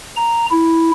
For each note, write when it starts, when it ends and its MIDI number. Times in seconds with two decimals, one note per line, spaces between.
0.16 0.46 82
0.50 0.91 64